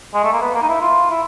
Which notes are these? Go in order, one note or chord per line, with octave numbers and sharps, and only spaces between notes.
G#3
A3
A#3
B3
A#3
D#4
E4
F4
E4